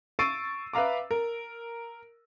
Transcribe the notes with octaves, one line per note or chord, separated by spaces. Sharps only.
C#6 E6 A6 C7 D7 D#7
B4 E5 F5 A#5 D6
A#4